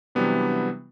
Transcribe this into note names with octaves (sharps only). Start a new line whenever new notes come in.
C3 E3 F#3 G3 B3 D4